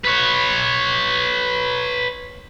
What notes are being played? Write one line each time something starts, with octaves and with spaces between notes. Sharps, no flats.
B4 C#5